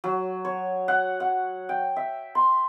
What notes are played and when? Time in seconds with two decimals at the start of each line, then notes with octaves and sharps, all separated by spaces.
0.04 F#3
0.45 C#5
0.88 F#5
1.20 F#5
1.69 G5
1.96 E5
2.35 C6